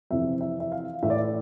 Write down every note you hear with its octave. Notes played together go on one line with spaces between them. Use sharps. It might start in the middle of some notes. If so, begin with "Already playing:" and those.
F2 C3 E3 E5
E5
E5
F5
A2 E3 E5
D5
E5